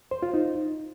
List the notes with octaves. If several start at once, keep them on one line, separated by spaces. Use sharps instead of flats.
C5
F4
D#4